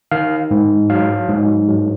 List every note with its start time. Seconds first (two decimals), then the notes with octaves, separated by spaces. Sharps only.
0.11 D#3 F5
0.51 G#2
0.90 F#3 F5
1.29 G#2
1.68 F#3